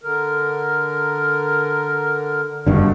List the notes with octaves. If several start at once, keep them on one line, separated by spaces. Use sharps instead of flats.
D3 A#4
F#1 G2 B2 D3 A3